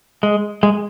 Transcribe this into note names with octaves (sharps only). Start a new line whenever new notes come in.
G#3
G#3